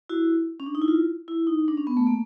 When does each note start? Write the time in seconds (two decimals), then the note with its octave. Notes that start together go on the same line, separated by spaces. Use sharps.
0.09 E4 F#4
0.60 C#4
0.66 D4
0.75 D#4
0.82 E4
0.88 F4
1.28 E4
1.47 D#4
1.68 D4
1.77 C#4
1.87 B3
1.97 A3
2.07 A#3